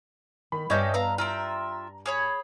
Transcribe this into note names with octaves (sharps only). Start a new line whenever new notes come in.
D#3 B5
G2 C#4 G4 A4 C#5 D#5 E5 A5
B3 F5 A#5 E6
F4 E5 G5 A#5
G#4 C#5 B5